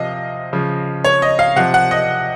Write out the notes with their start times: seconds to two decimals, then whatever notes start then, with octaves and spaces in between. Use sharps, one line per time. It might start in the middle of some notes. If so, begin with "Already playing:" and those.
Already playing: C3 F3 D#5 F5
0.53 C#3 F3
1.04 C#5
1.22 D#5
1.39 F5
1.56 C3 F3 F#5
1.74 F#5
1.91 D#5